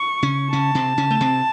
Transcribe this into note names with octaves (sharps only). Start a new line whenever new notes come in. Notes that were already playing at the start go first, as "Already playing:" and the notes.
Already playing: C#6
C#3 C#4
C#3 C#4 A5
C3 C4
C#3 C#4
A3
C3 C4